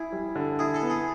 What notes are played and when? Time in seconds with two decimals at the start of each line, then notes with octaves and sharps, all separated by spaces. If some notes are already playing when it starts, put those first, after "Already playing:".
Already playing: E4 G#4
0.12 G3
0.35 D3
0.59 E4 G#4
0.74 A4
0.83 B3
0.90 G#4